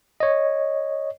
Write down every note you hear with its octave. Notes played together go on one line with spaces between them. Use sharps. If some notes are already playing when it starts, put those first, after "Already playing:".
C#5 D#5